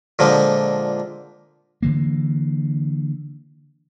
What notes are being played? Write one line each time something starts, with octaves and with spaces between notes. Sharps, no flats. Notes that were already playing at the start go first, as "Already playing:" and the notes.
A#2 D3 F3 G#3
D3 E3 A#3